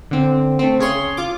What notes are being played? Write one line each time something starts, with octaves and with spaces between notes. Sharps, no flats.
D3 C4
A3 C4
C#3 G#4 C#5 C6
F4 D6